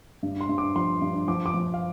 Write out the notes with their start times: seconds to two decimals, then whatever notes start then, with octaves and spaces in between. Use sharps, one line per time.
0.23 G2
0.41 C6
0.49 G2
0.58 D6
0.76 F3 C6
1.02 G2
1.28 F3 D6
1.46 D6
1.54 F3
1.74 F5